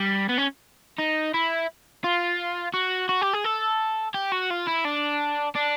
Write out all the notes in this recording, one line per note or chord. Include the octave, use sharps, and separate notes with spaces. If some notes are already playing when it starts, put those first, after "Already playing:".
Already playing: G3
B3
C#4
D#4
E4
F4
F#4
F#4
G4
G#4
A4
G4
F#4
F4
E4
D4
D4